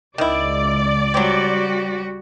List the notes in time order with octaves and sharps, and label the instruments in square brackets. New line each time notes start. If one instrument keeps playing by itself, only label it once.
[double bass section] C#2 [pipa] D#3 E4 [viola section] D5
[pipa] F#3 C4 [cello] G3 F#4